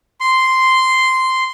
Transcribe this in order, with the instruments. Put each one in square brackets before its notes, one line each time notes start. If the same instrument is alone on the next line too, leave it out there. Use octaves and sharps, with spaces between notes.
[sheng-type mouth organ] C6